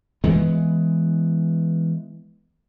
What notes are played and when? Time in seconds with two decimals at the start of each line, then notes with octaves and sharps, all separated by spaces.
0.24 E3 G#3 B3